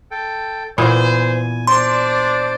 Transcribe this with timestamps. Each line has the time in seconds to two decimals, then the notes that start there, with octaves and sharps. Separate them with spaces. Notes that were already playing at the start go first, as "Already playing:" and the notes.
0.11 A4 G5
0.78 A#2 E3 B3 C5 G#5
1.67 D4 C5 D5 C6